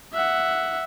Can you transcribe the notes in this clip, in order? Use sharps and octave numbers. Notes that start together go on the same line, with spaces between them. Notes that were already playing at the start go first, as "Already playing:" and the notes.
E5 F#5